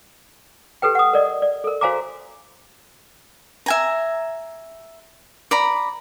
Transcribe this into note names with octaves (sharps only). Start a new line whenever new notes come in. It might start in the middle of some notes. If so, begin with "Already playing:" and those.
G4 A4 B4 G5
F#5 D#6
A#4 D5 D#5
D5
A4 A#4
F#4 C5 F5 G#5 A#5 D6
E5 G#5 A#5
D5 A#5 B5